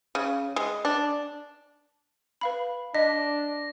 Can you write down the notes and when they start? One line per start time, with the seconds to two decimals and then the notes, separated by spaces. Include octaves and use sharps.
0.15 C#3
0.56 G#3
0.85 D4
2.41 B4 F5 B5
2.95 D4 D#5 A#6 B6